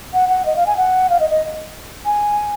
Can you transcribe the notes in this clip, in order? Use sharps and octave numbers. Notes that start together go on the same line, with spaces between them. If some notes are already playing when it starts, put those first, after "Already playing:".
F#5
F#5
D#5
F5
G#5
F#5
F5
D#5
D#5
G#5